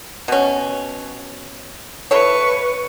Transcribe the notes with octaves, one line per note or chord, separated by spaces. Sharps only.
B2 C#4
E4 A4 B4 C#5 C#6